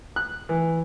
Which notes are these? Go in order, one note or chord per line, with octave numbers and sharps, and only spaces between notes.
F#6
E3